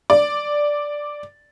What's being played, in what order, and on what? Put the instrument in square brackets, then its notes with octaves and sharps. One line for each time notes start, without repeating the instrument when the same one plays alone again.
[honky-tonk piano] D5